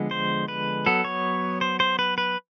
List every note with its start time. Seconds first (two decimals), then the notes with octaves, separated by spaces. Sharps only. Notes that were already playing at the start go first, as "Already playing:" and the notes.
Already playing: D3 F3 G#3 B3
0.11 C5
0.48 B4
0.86 F#3 B3 A4
1.04 C#5
1.61 C5
1.80 C5
1.99 B4
2.18 B4